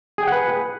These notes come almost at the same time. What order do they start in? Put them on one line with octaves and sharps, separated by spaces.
G#4 G5 F#5 B4